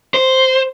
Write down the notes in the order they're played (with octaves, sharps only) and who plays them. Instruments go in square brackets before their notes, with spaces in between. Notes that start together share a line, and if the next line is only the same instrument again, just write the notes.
[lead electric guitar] C5